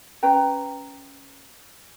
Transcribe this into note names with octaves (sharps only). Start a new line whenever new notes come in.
C#4 B4 G5 A#5